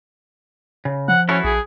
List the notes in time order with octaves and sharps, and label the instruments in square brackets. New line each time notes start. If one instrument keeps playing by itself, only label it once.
[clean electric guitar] C#3
[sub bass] F3 [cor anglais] F#5
[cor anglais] C#4 [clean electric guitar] E4 F#4 A4
[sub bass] A#1 [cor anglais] G#4